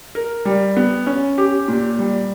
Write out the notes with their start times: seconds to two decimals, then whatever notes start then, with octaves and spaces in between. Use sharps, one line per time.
0.15 A#4
0.45 G3
0.77 B3
1.06 C#4
1.38 G4
1.68 A#2
1.99 G3